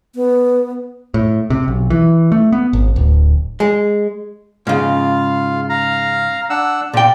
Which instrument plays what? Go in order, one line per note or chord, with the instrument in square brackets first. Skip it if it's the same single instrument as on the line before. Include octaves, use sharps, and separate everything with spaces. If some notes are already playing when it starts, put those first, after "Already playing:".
[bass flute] B3
[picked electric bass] A2
C3
B1
E3
A3
B3
G#1
D1
[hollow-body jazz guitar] G#3
[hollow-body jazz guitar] G#2 C#3 [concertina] F4 F5
[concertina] F5 A#5
D4 F#5 E6
[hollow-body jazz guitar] A#2 G5 [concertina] D5